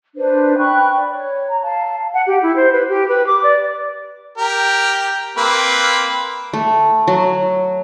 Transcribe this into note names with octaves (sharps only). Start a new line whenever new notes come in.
D4 B4 C5
G5 B5 C#6 F#6
D5
C#5
A#5
F5 A5
F#5
G4
E4
C5
B4
G4
B4
D6
D5
G4 A#4
A#3 C4 B4
A3
F#3